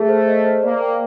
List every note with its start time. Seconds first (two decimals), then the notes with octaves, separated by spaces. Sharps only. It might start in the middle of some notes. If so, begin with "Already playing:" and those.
Already playing: A3 G#4
0.09 C5
0.28 D#5
0.45 C5
0.63 A#3 D5
0.81 G5